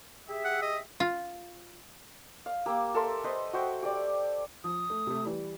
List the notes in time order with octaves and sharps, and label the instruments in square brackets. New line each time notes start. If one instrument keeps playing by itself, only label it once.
[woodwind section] G4 G#4 E5
[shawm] F#5
D#5
[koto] F4
[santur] F5
A#3 G4 E6
A4 A#4 E5 C6
B4 C5 D#5
F#4 C5 E5 G5
G4 D5
[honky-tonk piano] F3 [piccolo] D#6
[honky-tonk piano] A3
C3 A3
E3 G3